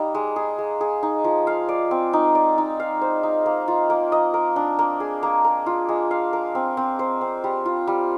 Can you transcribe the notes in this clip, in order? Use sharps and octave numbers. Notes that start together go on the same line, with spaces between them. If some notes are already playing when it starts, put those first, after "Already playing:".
Already playing: G3 A#3 D#4
G#3
G#4
G#3
G#4
D#4
F3
F5
D5
C4
D#4
D5
D#4
F5
C5
D#4
A#3
F4
A#3
D#5
A#4
D4
A#3
G#4
A#3
A#4
F4
G#3
F5
A#4
C4
C4
C5
C4
G3
F4
G3